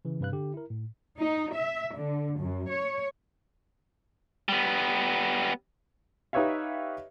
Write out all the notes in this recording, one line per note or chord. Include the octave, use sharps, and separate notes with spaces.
C#3 E3
G2 C3 B4 F5 F#6
D3 G4
E4 A#4
A2
D#4
E5
D3
F#2
C#5
G3 B3
D#4 G4 B4 C#5 E5 F5